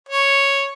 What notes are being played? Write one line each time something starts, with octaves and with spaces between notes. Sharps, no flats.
C#5